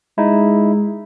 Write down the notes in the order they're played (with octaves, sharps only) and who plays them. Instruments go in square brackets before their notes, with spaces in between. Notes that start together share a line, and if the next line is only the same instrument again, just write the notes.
[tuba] G#3 [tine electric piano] D#4 E4